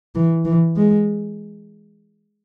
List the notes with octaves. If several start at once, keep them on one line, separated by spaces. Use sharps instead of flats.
E3
E3
G#3